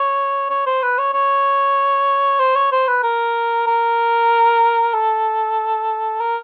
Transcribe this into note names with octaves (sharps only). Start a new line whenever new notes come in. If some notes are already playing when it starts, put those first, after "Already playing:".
Already playing: C#5
C#5
C5
B4
C#5
C#5
C5
C#5
C5
B4
A#4
A#4
A4
A#4